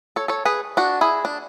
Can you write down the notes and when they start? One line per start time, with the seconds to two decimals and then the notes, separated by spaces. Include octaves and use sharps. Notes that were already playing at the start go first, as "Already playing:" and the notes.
0.16 A4 C#5
0.28 A4 C#5
0.45 G#4 B4
0.77 D4 F#4
1.01 E4 G#4
1.25 D4